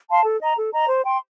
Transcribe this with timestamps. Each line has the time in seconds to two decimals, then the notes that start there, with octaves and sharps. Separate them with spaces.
0.10 F5 A5 C6
0.26 A4
0.41 D#5 A#5
0.58 A4
0.74 D#5 A#5
0.89 C5
1.05 G5 C6